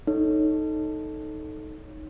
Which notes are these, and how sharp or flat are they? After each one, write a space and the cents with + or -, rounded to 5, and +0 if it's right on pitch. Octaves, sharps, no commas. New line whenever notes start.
D#4 +0 A4 +0 C#5 +0